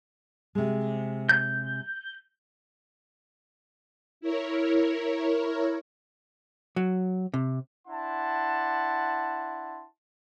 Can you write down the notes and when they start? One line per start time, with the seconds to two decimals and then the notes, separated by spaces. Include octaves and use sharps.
0.55 C3 G#3
1.29 G6
4.21 E4 A#4 C#5
6.76 F#3
7.34 C3
7.88 D4 E4 F#5 A5 C6